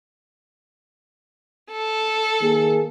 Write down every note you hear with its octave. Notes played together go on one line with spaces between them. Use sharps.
A4
D#3 A#3 G#4